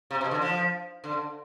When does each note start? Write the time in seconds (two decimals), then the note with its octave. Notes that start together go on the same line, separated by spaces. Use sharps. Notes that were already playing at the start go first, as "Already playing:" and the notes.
0.11 C3
0.21 B2
0.31 D3
0.42 F3
1.04 D3